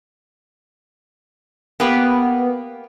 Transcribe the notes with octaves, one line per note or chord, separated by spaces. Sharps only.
A#3 B3 G4 B4